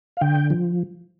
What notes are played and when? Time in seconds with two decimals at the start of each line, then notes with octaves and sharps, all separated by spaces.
0.17 F5
0.21 D3 G5
0.50 F3